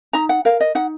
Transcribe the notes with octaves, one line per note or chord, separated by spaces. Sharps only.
D#4 A#5
F#5
A#4 F5
D#5
D#4 F#5